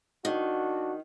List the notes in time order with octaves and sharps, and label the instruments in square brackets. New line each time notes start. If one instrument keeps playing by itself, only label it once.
[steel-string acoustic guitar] D#3 [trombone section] D4 F#4